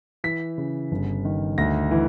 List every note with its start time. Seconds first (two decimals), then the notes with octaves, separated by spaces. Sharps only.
0.24 E3 B6
0.58 C#3
0.92 G1
1.25 D#3
1.58 D2 A#6
1.91 E3